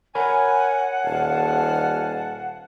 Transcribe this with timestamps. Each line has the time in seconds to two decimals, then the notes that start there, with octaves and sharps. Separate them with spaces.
0.15 A#4 C#5 F#5 G#5 B5
1.05 D#1 F5 G#5 A5